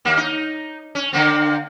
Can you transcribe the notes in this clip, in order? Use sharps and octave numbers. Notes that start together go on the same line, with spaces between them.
D#2 A#3
D#4
C#4
D3 A#3 C4